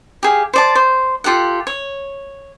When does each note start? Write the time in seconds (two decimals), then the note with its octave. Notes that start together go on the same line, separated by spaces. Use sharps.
0.23 G4 G#4 F5
0.53 C5 D5 A5
0.75 C5
1.24 F4 G4 A4 F#5
1.67 C#5